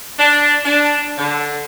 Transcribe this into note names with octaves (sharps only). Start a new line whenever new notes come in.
D4
D4
D3